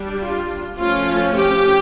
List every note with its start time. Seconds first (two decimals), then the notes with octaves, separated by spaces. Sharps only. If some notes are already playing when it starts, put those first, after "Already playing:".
Already playing: G3 D4
0.22 F4
0.78 F3 A3 C#4 F4
1.35 G4